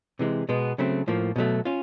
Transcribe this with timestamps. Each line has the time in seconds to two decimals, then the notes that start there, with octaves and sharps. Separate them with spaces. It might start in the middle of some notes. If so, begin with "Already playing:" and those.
0.19 C3 E3 G#3
0.49 B2 G#3 B3
0.78 C#3 F#3 A3 C4
1.08 A2 F3 A#3
1.36 B2 F#3 A3
1.65 C#4 F4